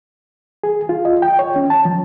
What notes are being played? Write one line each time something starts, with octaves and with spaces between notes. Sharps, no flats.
G#4
F4
D#5
G5
C#5
C#4
A5
F3